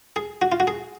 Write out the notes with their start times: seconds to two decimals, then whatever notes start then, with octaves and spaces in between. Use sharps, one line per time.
0.16 G#4
0.42 F#4
0.52 F4
0.60 F#4
0.67 G#4